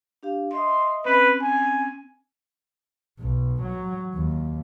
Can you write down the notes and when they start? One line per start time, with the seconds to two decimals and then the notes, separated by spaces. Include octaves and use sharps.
0.23 D4 G4 F5
0.53 D#5 E5 C6 D#6
1.05 C4 C#4 B4
1.42 G#5
3.19 B1
3.62 F#3
4.14 D#2